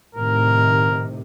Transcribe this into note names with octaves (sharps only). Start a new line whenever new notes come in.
A2 C3 D#3 A#4